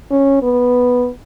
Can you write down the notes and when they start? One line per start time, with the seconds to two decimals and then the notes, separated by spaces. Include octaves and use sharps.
0.11 C#4
0.43 B3